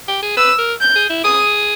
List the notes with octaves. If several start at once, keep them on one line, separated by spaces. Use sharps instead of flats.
G4
G#4
B4 E6
A#4
G6
G#4
E4
G#4 D#6